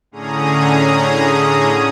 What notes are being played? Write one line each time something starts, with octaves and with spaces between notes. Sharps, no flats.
A2 D3 C#4 G#4 A#5 D#6